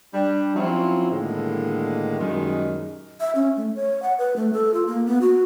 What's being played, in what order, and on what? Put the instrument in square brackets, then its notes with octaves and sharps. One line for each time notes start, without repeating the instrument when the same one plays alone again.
[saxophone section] G3 D4
F3 F#3 C4 C#4 E4 F4
A2 D3 D#3 G3 G#3 A#3
F#2 A#2 D#3 G3 G#3
[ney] E5
C#4
A3
C#5
F#5
B4
A3
A4
F4
A#3
B3
F#4